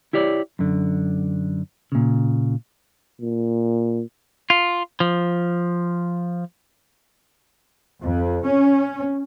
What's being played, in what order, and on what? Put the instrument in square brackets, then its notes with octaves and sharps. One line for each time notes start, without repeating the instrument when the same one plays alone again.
[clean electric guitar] E4 G4 C#5 D5
F#2 D3
A#2 C#3
[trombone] A#2
[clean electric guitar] F4
F3
[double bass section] F2
C#4